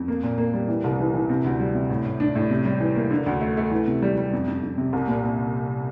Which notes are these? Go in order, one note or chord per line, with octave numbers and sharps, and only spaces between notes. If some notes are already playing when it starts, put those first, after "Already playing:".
Already playing: F2
A#3
A#2
A#3
G3
E3
C2
E3
E3
C3
D2
G3
C3
A2
A2
D4
A2
C3
G3
E3
A#3
D3
D2
A3
A3
E3
C3
G3
G3
F2
F2
F2
C3
C2
A#2
A#3